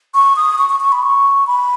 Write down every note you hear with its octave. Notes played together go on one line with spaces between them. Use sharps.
C#6
D#6
C#6
C#6
C#6
B5
C#6
B5